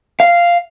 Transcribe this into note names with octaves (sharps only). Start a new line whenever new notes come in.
F5